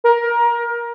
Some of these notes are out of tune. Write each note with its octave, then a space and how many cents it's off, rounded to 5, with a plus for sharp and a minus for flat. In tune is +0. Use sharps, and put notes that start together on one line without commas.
A#4 +20